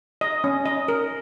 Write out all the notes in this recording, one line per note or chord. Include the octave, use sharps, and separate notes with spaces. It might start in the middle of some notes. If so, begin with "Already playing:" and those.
D#5
C#4
D#5
A#4